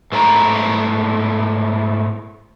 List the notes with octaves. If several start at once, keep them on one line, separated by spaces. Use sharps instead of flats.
G#2 A3 B3 E4 A#5